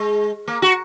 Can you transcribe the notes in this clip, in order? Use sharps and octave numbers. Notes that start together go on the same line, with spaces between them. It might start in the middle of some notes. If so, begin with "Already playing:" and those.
Already playing: G#3
A#3
F#4